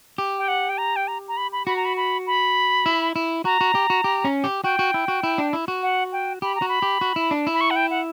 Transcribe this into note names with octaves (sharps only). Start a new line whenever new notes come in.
G4
G5
F#5
G5
A#5
G5
A#5
A#5
B5
B5
F#4 B5
A#5
B5
B5
B5
E4
E4
F#4 A#5
F#4
G4
F#4
G4
C#4
G4
F#4 G5
F#4
E4
F#4
E4
D4
E4
F#4
F#5
G5
G4 B5
A#5
F#4
B5
G4
F#4
E4
D4
E4
B5
C#6
F#5
G5
F#5